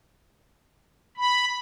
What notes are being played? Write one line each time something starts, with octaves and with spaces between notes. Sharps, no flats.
B5